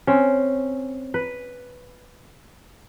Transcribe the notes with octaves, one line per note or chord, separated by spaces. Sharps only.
C4 C#4
B4